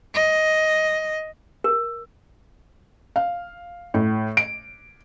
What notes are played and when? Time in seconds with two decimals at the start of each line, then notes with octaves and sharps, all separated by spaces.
0.14 D#5
1.64 A#4
3.16 F5
3.94 A2
4.37 D7